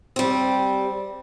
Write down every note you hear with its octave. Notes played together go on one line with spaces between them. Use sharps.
G3 C4